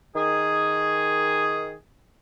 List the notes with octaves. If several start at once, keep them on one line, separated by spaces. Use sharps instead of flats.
D#3 G#4